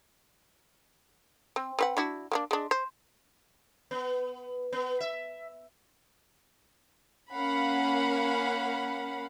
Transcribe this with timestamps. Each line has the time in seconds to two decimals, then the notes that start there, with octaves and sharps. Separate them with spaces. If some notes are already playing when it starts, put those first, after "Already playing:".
1.56 C4
1.79 C4 B4 F#5
1.97 D4 E4 F#4
2.32 A#3 B3 D4
2.51 G#3 D4
2.71 C5
3.91 B3
4.72 B3
5.00 E5
7.32 A#3 C#4 F5 F#5 B5